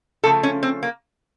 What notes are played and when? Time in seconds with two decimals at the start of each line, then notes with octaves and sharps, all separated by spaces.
0.24 C#3 F3 A3 A4
0.43 C#4
0.63 C4
0.83 A#3